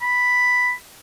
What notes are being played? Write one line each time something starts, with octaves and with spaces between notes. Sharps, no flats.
B5